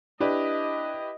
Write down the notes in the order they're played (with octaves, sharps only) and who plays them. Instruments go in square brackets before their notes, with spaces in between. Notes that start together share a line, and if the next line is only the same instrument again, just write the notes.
[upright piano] D4 [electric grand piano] E4 G4 B4 [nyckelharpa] D#5